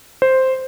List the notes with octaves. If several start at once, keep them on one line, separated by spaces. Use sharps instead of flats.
C5